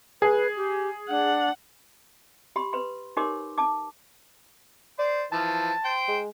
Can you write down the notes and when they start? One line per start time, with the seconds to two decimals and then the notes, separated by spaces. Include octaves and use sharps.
0.22 G#4 B4
0.56 G4
1.09 D4 F#5
2.56 G4 B5 C6
2.73 B4 C6
3.17 D#4 G4 A#4 C#5 C6 D6
3.58 A5 D6
4.99 C5 D5
5.32 E3 F3 A5
5.85 C5 G5
6.08 G#3